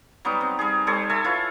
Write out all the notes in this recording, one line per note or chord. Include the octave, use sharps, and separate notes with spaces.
F#3 G3 B3 D#4
C4
G3 D#4 G#4
G3 A4 C5 C#5
A4 E5 G#5 C#6
E4 F4 B4 C#5